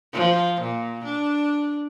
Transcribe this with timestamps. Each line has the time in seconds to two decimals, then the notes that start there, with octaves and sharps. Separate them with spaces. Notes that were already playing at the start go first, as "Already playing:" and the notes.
0.13 F3
0.61 A#2
1.04 D4